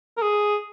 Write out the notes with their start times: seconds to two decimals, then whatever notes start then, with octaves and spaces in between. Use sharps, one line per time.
0.17 A#4
0.22 G#4